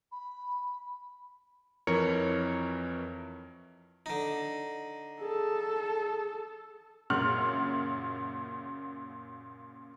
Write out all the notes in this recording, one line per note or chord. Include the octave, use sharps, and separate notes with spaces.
B5
F2 E3 A#4 C#5 C#7
D3 D#4
G#4 A4
F#2 A#2 C#3 F#3 F6 F#7